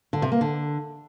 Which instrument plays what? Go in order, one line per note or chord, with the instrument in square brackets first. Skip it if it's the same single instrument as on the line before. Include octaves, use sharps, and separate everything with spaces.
[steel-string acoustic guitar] D3
C3
A#3
D3